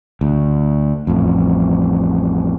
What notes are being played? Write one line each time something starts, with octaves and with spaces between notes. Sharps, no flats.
D2
A1 F2